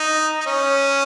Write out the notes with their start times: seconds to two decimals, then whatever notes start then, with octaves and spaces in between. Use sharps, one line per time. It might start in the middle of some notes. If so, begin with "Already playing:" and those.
Already playing: D#4
0.40 D#4
0.46 C#4